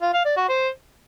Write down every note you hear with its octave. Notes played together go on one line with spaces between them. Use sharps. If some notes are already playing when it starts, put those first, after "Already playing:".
F4
F5
D5
F#4
C5